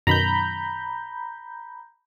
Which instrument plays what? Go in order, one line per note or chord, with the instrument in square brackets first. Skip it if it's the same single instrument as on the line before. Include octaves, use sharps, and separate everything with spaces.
[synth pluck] F#2 B2 D#3 [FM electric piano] A#5 B5 G6